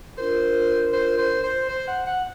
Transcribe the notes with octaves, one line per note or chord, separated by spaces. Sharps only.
D4 F4 A#4 C5
C5
C5
C5
C5
F#5
F#5